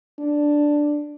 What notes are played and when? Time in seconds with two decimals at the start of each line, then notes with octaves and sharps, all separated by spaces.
0.19 D4